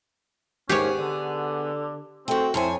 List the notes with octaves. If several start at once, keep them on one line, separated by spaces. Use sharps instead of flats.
D#2 G#2 B3 C#4 G4 G#4 C#5
D3
A3 C4 F#4 G5
F2 E4 C5 C#5 G#5